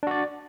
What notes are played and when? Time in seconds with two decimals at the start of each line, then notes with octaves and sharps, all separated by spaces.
0.03 D4
0.07 F#4
0.11 D5